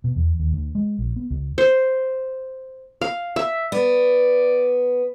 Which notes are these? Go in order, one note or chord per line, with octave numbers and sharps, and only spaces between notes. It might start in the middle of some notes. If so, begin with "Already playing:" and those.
B2
E2
D#2
D2
G#3
A#1
B3
C#2
C5
F5
E5
B3 D5